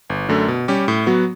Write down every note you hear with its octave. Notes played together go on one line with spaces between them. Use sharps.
G1
F#2 D3 A3
B2
G3 C#4 G4
A2
F#3 B3 F#4